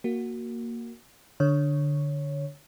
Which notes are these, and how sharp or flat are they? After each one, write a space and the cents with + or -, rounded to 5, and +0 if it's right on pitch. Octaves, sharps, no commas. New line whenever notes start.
A#3 +0 F#4 +0
D3 +0 C#5 +0